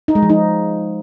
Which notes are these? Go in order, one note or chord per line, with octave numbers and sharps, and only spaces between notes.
D#4
G#3
F3
D#4